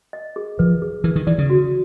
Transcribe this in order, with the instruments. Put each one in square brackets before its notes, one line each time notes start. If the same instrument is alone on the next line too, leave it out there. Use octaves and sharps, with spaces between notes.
[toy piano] D#5
G#4
[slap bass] F3 [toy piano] B4
[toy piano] G#4
[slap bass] E3 [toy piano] B4
[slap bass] D#3
[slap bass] E3 [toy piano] D5
[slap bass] C#3
[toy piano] F#4